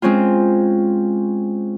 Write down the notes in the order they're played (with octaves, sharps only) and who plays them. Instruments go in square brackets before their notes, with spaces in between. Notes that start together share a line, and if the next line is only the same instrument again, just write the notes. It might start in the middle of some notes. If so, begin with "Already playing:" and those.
[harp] G#3 C4 C#4 F4